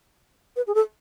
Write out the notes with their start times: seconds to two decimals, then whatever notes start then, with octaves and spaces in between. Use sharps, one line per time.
0.56 B4
0.67 G#4
0.75 A4